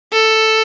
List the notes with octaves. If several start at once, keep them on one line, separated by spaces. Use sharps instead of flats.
A4